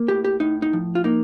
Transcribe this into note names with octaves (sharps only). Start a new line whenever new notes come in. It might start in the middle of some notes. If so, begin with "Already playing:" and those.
Already playing: A#3
A2 G4
G4
A2 D#4
D#4
F3
F4
A#3 D#4